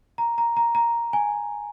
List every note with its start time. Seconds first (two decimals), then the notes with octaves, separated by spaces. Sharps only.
0.18 A#5
0.38 A#5
0.57 A#5
0.75 A#5
1.13 G#5